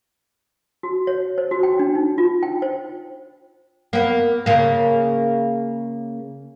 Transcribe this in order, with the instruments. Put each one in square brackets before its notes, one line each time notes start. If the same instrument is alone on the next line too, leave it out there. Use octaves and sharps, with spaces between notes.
[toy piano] F#4
C#5
C5
F#4
G5
D4
D#4
F4
G5
C5
[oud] A#3 B3
C#3 A#3